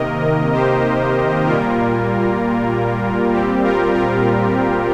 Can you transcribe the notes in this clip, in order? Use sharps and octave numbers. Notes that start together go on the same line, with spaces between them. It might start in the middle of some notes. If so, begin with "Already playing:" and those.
Already playing: C3 D#3 A#3 A#4 D#5
G4 C5
A#2 G3 A#3 F4 A#4
A#2 G3 C4 G4
F4 A#4
F4 A#4